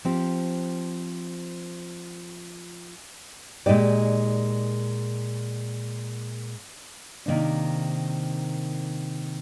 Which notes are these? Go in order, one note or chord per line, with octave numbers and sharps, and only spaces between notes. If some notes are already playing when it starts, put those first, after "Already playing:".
F3 C4 G4
A#2 G#3 D#4 G4 D5
C3 D#3 A#3 D4